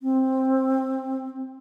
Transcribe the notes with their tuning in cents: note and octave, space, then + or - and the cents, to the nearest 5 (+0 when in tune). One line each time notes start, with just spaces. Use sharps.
C4 +10